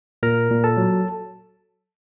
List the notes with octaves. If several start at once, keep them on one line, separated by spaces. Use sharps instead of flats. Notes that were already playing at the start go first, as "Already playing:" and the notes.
A#2 A#4 A#5
A#2
A4 A5
F#3